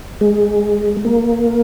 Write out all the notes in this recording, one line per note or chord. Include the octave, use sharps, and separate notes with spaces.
G#3
A#3